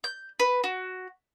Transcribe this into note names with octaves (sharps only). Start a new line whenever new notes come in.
G6
B4
F#4